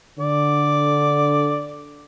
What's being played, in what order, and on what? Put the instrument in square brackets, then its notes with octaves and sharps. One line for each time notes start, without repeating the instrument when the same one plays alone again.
[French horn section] D3 [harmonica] D5